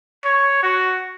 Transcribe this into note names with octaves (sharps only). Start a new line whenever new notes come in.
C#5
F#4